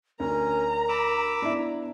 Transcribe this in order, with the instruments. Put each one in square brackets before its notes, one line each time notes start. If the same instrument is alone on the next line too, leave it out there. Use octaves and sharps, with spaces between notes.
[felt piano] D2 [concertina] C#4 [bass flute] A#4 [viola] A#5
[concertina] B5 D6 E6
[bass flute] B3 [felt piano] D4 E4